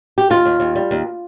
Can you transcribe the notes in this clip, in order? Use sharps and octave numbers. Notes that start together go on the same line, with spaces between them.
G4
D#2 F4
D#2
D#2
G3
D#2